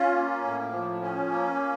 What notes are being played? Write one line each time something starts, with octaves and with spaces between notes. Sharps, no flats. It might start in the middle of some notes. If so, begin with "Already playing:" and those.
Already playing: C#4 F4
A#3
A2
F3
C#4
A#3